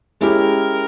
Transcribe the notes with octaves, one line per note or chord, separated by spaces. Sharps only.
G#3 C#4 E4 G4 A#4